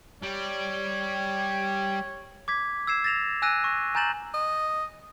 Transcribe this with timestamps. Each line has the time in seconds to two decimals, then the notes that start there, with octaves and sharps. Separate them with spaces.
0.23 G3 C#5
2.48 D6 G#6 B6
2.87 E6 G#6 C7 E7
3.04 A6 A#6 E7 F7
3.42 G#5 E6 F#6 A#6 D#7
3.64 C#6 A#6
3.95 G#5 A#5 G6 A6 E7 F#7
4.34 D#5